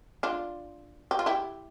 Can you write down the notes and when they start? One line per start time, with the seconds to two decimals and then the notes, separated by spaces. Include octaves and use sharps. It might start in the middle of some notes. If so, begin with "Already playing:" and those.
0.23 D4 F4
1.11 G4
1.19 F4
1.26 E4 G4